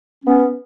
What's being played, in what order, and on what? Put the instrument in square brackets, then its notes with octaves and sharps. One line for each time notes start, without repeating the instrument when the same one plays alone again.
[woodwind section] B3 C#4